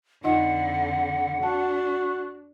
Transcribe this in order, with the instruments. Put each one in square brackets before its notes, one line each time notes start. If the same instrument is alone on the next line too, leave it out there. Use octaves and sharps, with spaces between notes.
[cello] F2 D3 [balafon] D#4 F4 D#5 [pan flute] F#5
[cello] D4 [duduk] F#4 [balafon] A5